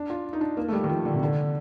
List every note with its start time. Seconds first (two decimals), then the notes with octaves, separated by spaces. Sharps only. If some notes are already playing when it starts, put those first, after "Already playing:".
Already playing: D4
0.10 F4
0.33 D#4
0.41 D4
0.57 A#3
0.68 A3
0.72 G3
0.84 D#3
0.89 F3
1.05 D3
1.14 C3
1.23 D3